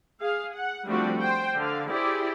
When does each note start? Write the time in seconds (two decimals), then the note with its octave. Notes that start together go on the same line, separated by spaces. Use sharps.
0.20 G#4 F5
0.55 F#5
0.86 F3 G3 A3 C4 D4 F#4
1.20 C5 G5
1.56 D3 F5
1.87 E4 G4 G#4 C5 D5